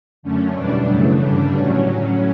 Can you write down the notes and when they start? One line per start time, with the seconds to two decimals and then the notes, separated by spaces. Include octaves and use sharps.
0.23 F#2 D3 A3 C#4
0.55 E2 B2 G3 D4
0.88 F#2 C#3 E3 A3
1.21 G2 D3 G3 D4
1.54 A2 F#3 C#4